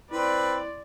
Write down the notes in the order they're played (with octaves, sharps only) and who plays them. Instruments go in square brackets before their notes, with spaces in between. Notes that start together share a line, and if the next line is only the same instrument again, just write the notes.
[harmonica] C4 B4 [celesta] E4 C6 [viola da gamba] D5